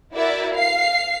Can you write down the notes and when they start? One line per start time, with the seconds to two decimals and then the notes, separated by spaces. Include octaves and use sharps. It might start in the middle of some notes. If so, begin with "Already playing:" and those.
0.14 E4 F#4 A#4 D5 E5
0.53 F5 C7